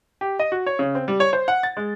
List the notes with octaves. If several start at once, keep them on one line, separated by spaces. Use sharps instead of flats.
G4
D#5
F#4
C#5
C#3
C4
G3
C#5
C5
F#5
A6
G#3